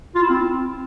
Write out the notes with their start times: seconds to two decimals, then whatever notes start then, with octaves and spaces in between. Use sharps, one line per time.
0.15 F4
0.22 E4
0.30 C4